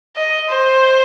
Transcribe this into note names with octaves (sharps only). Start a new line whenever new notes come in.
D#5
C5